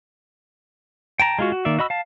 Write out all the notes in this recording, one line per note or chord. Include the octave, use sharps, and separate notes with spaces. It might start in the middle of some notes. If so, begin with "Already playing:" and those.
G5 A5 A#5
G#3 F4 F#4
F#4
D#3 A#3 D5 E5
F#4 D#5 B5 E6
F5 A5